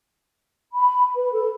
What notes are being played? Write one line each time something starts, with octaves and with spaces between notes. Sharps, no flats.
B5
B4
A4